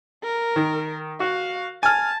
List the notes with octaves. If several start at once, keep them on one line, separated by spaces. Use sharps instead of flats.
A#4
D#3
F#4 F5
G#5 A5 F6